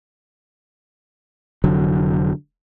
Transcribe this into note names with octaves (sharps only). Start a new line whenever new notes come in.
F1 D3 F#3